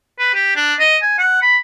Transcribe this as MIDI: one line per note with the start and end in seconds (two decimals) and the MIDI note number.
0.18 0.29 71
0.34 0.51 67
0.56 0.74 62
0.79 0.97 75
1.02 1.14 80
1.18 1.41 78
1.42 1.57 83